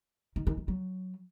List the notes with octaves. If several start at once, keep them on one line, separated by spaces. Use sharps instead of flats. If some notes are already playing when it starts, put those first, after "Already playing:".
D#3
D#3
D#3
F#3